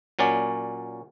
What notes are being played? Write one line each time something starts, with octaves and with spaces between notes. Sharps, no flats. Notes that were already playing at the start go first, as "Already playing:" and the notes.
A#2 F#3 C#4 D5